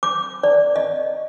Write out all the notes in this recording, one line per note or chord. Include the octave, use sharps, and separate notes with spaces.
D6
D5
D#5